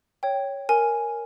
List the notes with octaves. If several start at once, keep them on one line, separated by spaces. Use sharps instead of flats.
C#5 G5
A#4 G#5